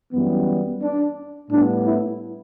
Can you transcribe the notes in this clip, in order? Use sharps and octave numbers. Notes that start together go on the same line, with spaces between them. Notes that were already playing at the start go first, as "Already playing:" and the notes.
F#2 E3 G3 B3
D4
A2 G3 B3 D4
E4